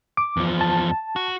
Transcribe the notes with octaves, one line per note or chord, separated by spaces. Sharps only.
D6
E2 F3
A5
F#4